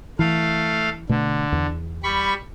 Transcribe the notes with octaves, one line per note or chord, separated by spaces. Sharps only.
E3 A3 F5
B2 D3 A3
E2
G3 B5 C#6